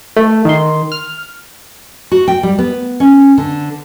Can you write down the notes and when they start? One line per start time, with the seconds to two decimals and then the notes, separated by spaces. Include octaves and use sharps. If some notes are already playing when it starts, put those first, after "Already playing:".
0.16 A3
0.45 D#3 C6
0.92 F6
2.12 F#4
2.28 G5
2.43 G3
2.59 B3
3.00 C#4
3.38 D3